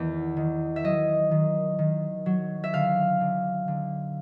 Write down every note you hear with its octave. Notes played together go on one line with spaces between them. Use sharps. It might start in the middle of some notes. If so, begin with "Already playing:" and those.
Already playing: E2 D#3
D#3
E5
F#3 D#5
D#3
D#3
F#3
E5
D3 F5
D3
D3